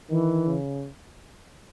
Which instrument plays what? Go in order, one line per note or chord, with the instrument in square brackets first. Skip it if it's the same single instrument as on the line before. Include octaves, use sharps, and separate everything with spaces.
[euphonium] D#3 [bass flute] E3
[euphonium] C#3